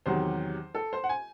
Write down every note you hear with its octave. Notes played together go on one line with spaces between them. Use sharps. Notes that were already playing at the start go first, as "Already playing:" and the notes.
E2 C3 D#3 F#3 C5
A4
C5
F#5
G#5